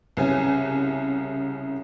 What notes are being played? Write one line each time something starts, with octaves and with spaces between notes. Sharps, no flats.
C2 C#3 G#5